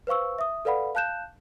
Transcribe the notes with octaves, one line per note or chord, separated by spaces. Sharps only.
B4 C5 F5 C#6 E6
E5 D#6
A4 B4 D5 F5 F#5 B5
F5 A5 F#6 G6 E7